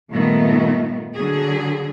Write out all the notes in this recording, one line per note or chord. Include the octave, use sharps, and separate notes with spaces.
G2 A#2 D#3 A3 B3
D3 F#3 G#4